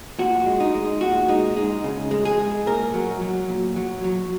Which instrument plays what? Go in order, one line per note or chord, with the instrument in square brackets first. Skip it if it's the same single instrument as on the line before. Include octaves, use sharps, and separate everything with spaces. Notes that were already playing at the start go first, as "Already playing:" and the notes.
[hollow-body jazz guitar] A#2 F#4
G#3
D#4
G#3
A#2 F#4
G#3 D#4
G#3 D#4
C#3
G#3
G#4
G#3
A#2 A#4
F#3
F#3
A#2
F#3
F#3